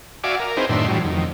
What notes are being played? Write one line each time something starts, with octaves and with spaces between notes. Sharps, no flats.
F#4 D5 E5 F5 G#5 D6
A#4
C4 D#4 E4 G#4 B4 C5
F#2 A2 D#3 D4 E5 C6
A2 E3 F#3 G3
F2 D#3